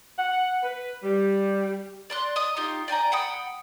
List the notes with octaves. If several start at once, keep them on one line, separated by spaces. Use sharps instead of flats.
F#5
B4
G3
D5 C6 F#6
D#5 D#6
D#4 F4 G4
D5 G5 G#5 A#5
F#5 G5 B5 D#6